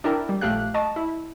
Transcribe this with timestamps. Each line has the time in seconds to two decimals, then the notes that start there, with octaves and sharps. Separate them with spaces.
0.04 D4 E4 A#4 G5
0.29 G3
0.41 A#1 A3 G4 F5 F#6
0.74 D#5 A5 C#6
0.96 E4